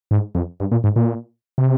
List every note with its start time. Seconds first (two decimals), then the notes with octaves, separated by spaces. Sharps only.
0.11 G#2
0.35 F2
0.60 G2
0.72 A#2
0.84 G#2
0.96 A#2
1.58 C3